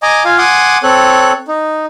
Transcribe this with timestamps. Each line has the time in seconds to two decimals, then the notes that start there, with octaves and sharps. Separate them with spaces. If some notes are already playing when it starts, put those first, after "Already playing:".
0.03 D#5 G#5 A#5 D6
0.25 F4 F5 G#5
0.38 F#5 G#5 C6 D6 D#6
0.83 C4 A4 C#5 F#6
1.48 D#4